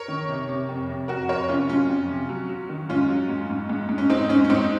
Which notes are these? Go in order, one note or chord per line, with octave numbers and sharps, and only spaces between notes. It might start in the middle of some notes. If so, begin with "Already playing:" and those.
Already playing: A#4 C#5
D#3
C3
C3
F2
C3
F2 F#4 A#4
F2 A#4 C#5
C3 C#4 F4
F#3 C#4 F4
F2
C3
F#3
F#3
D#3
G#2 C#4 F4
F#3
G#2
G#2
G#2
G#2
C#4
G#2 C4 D#4
G#2 C#4
C#4
G#2 C4 D#4